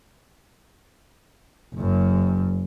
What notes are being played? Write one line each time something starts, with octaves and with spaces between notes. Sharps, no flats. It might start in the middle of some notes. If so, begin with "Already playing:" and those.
F#1 F#2